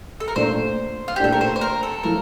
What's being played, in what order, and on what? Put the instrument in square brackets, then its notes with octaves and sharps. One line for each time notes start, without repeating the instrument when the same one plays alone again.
[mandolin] A4
A#4
[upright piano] A#2 A3 D4 [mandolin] C5
[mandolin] F4
G4
[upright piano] A#2 A3 D4 [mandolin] A4
[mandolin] A#4
C5
C5
A#4
A4
[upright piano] A2 F3 A3 [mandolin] A#4